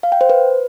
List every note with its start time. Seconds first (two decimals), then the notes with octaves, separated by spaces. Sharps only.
0.03 F5
0.12 G5
0.21 C5
0.29 B4